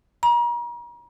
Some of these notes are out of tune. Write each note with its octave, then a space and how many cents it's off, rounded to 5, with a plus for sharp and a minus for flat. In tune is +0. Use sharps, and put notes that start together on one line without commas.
A#5 +40